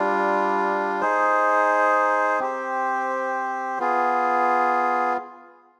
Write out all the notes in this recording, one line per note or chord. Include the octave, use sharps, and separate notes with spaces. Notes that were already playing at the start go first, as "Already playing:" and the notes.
Already playing: G3 D4 F4
D#4 G#4 C5
C4 G4 C5
B3 F4 G#4